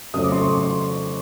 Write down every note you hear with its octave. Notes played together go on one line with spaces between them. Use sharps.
F2 C#3 F#3 A3 C#4 D#6
D6
C6
C#6
D6
C6